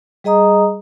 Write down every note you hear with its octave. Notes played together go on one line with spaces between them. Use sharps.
G3 G#4 D#5 A#5 D#6